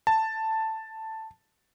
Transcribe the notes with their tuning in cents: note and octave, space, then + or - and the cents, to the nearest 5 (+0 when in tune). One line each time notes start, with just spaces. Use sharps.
A5 +5